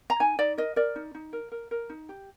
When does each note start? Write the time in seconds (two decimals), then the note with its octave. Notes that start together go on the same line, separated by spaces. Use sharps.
0.10 A#5
0.20 D#4 G#5
0.39 D#4 D5
0.58 A#4 D#5
0.76 A#4 D5
0.96 D#4
1.15 D#4
1.33 A#4
1.52 A#4
1.71 A#4
1.90 D#4
2.09 G4